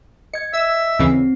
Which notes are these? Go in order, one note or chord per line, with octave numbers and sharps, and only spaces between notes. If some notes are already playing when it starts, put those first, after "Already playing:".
D#5 G#6 C#7
D#5 E5 E6
D#2 C#3 E3 C4 C7